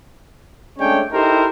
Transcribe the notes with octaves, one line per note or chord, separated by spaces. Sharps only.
G#3 A3 C#4 D4 C#5 G5
D#4 E4 G4 A4 A#4 C5